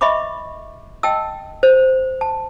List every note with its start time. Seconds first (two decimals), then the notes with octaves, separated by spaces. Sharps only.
0.01 D#5 E5 B5 C#6 D6
1.03 D#5 G5 A5 E6
1.63 C5
2.21 A5